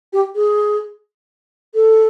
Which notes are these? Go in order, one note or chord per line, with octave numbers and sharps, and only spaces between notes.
G4
G#4
A4